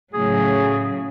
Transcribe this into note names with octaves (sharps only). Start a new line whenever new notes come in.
A2 C#3 F#3 G#4